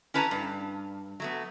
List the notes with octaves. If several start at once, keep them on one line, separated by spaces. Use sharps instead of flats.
C#4 E4 B4 A5 A#5
G2
F#3 A3 B3